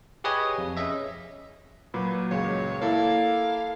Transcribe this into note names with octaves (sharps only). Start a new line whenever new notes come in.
G4 G#4 B4 C#5 D#5 G#5
F2
C#4 G#4 D#5 E5
A#2 F#3 B4
C#2 C#5
A#3 E4 A4 F5